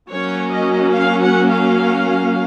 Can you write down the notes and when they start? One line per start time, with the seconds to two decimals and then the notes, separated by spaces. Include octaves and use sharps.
0.10 F#3 A#3 C#4 C#5
0.53 D#5
0.95 F5
1.23 F#5
1.51 F5